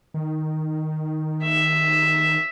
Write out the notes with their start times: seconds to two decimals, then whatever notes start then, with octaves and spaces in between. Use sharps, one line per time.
0.14 D#3
1.44 E5